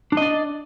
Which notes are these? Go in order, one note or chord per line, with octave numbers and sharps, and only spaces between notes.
D4 D5 D#5